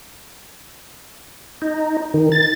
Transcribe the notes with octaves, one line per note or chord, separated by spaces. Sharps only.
D#4
D#3
A6